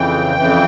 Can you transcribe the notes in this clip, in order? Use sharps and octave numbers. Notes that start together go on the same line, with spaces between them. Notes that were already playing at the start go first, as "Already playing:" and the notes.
Already playing: F2 C#3 E3 G5
F2 C#3 E3